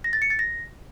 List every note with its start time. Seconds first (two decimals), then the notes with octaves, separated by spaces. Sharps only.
0.04 A#6
0.13 A6
0.22 C#7
0.30 A6
0.39 A#6